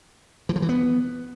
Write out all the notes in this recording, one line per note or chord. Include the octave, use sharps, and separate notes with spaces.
E3
F3
E3
B3